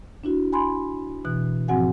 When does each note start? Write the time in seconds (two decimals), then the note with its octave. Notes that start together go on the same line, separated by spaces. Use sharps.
0.24 D4 E4 F#4
0.53 G#5 B5 C6
1.25 B2 E3 F#6
1.68 G#2 F3 C4 F#4 F#5 G#5